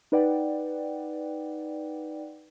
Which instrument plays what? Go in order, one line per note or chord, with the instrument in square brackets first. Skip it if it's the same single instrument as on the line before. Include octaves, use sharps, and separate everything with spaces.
[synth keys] D#4 B4 D5 F#5 G5